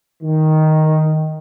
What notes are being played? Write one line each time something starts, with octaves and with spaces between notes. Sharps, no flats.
D#3